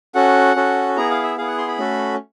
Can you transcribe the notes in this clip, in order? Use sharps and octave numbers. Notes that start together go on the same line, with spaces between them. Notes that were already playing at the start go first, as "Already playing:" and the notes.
C#4 F#4 A4 F#5
C#4 F#4 A4
B3 E4 G#4 A#5
F5
E5
B3 E4 G#4 F5
F#5
C6
B5
A3 C#4 F#4 A4